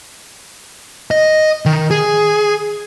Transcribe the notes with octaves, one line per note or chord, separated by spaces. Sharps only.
D#5
D#3
G#4